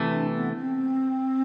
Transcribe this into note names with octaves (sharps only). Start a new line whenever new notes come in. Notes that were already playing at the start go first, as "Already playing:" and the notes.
Already playing: C3 E3 A3
D4
B3
C4